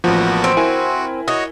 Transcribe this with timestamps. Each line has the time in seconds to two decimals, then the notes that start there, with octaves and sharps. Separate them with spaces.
0.04 A1 F3 A#3 B3 F#4
0.44 C4
0.57 E4 F#4 A#4 G#5
1.28 F#4 C#5 D#5